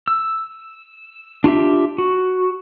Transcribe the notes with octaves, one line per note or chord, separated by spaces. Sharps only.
E6
D4 F4 G4 E5
F#4